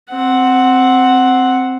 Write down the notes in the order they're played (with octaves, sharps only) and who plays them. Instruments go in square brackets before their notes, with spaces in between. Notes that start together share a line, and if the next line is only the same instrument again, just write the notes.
[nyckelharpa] C4 F#5